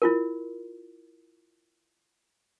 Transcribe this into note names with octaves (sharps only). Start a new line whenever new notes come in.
E4 F4 A#4